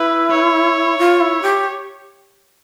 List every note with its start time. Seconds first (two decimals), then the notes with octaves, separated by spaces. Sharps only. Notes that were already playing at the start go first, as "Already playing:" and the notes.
Already playing: E4 B4
0.31 C#5
0.98 F4
1.20 E4
1.42 G4